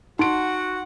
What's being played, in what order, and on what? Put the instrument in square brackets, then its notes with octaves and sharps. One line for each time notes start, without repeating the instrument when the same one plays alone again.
[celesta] D#4 [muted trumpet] F#4 [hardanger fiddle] F#5 [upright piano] C6 D7